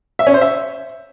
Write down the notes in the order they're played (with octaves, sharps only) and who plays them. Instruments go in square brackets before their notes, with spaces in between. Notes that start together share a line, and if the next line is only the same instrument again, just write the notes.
[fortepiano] E5
C#4
C5
E5